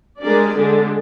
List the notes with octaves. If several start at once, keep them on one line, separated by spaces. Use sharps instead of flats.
G#3 D4 G4 A#4 D5
D3 G#3 D4 G4